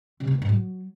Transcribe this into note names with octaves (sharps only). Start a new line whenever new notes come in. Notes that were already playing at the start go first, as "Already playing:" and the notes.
C3
C4
D#3
G#2
F#3